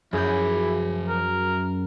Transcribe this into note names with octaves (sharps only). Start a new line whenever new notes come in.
F#2 F3 E4 G#4 G#5 G6
A#4